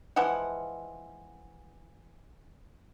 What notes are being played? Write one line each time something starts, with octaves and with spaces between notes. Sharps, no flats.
E3 F3 G#3 F#5